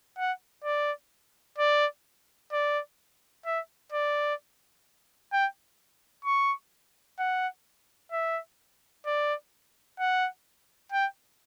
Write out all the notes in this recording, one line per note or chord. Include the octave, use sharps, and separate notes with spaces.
F#5
D5
D5
D5
E5
D5
G5
C#6
F#5
E5
D5
F#5
G5